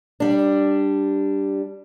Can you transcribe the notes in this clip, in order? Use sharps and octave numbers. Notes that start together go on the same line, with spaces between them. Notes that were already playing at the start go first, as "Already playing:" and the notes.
G3 D4